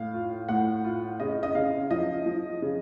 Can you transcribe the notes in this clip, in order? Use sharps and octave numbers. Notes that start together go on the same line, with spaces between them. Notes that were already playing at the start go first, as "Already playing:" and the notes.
Already playing: A2 F5
F4
A2 F#5
F4
C#3 D#5
D#5
C#3 F5
F3 D#5
F3
C#3